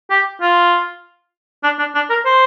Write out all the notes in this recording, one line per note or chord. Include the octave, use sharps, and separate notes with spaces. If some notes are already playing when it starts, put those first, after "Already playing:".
G4
F4
D4
D4
D4
A#4
C5